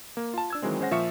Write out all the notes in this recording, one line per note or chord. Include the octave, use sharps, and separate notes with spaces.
A#3
F4 A5
D4 E6 G#6
D#3 E3 F#3 G#3 C4
G#3 C#4 C5 F#5 A#6
A#2 F3 E5 C#6 C#7